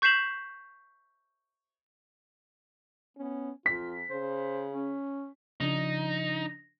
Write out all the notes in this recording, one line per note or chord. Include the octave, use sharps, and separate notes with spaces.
C#6 G6 B6 C7 E7 F#7
B3 C#4
F2 F4 B6
C#3 C5
C#4
C#3 F3 D4 D#4